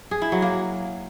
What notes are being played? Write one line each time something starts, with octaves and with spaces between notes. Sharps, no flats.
G#4
E4
F#3
A#3